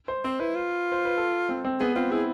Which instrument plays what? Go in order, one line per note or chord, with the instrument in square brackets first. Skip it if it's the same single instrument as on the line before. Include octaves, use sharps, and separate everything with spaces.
[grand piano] C5
[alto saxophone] C4 [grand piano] C5
[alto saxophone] E4 [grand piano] B4
[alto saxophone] F4
[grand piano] C5
B4
A4
C4
C4
[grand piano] B3 [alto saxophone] G#4
[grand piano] C4 [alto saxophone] F4
[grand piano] E4 [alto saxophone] G#4